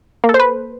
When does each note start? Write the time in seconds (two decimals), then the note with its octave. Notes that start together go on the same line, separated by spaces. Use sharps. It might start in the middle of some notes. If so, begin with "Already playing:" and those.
0.24 A#3
0.29 A4
0.34 C5
0.40 B4